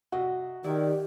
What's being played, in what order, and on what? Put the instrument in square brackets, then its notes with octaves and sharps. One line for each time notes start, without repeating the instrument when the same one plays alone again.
[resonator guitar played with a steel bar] C3 D#5 [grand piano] F#4
[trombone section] D#3 [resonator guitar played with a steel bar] E4 D5 [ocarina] G4